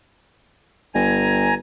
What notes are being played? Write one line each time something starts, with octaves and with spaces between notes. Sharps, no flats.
G1 G#5 A#5